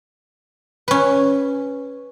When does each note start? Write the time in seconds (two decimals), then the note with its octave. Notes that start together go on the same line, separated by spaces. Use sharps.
0.88 C#4 B4